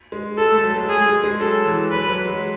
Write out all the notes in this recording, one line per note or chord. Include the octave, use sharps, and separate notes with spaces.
G#3
G#3 A4
A3
F#3
G#3
A3 G#4
G#3
G#3
F#3 A4
E3
F#3 B4
F#3
G#3